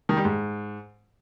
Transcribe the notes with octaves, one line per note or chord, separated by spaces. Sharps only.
D#3
G3
G#2